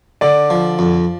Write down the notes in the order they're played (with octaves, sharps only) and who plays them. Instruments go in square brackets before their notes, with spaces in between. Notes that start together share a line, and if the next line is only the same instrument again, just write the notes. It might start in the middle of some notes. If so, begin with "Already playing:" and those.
[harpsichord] D3 [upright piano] D5
[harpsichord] F3
F2